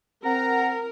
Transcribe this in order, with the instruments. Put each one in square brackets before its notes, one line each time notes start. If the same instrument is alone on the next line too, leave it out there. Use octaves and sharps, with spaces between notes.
[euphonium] C4 [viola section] A#4 [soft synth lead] F#5 [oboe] A#5